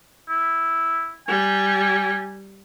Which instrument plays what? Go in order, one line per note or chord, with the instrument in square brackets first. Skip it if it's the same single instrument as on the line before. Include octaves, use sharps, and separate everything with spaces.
[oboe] E4
[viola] G3 [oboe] G#5